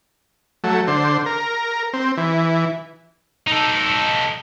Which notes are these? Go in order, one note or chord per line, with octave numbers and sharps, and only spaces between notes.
F#3 A3
D3 C5
A#4
C4
E3
D#4 A4